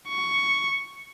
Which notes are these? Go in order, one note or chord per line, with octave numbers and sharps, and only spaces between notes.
C#6